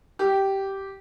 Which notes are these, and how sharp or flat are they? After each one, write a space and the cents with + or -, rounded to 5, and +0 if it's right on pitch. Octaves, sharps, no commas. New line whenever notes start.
G4 -10